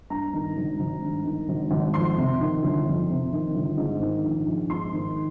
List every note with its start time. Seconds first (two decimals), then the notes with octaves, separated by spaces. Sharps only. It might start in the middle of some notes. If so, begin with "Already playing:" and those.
0.10 G2 A#5
0.34 D#3
0.57 G#1
0.80 G#1
1.02 G2
1.25 D#3
1.49 G#1
1.71 G#1
1.94 F2 C6
2.17 C3
2.41 D#3
2.63 G1
2.86 F2
3.10 C3
3.33 D#3
3.55 G1
3.77 G#2
4.00 D#3
4.23 A#1
4.46 A#1
4.70 G#2 C6
4.93 D#3